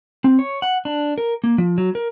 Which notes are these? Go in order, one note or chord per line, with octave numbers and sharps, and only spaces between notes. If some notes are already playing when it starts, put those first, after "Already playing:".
C4
C#5
F#5
D4
A#4
A#3
F3
F#3
A#4